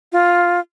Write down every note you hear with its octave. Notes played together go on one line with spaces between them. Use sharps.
F4